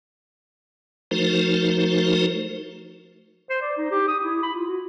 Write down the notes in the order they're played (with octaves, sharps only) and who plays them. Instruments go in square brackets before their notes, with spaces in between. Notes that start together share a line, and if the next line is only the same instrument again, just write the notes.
[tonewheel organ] F3 A3 D#4 F#4 A#4 C5
[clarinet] C5
D5
D#4
G4
D#6
E4
B5
F4
F#4